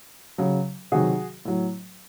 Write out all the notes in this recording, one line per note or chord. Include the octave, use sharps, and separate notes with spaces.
C#3 F#3
C3 D#3 F#3 F#4 G#4
A2 F#3